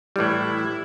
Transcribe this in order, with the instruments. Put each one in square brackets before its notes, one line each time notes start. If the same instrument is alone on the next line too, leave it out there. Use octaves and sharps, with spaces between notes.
[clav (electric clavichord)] A2 E3 G3 [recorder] E4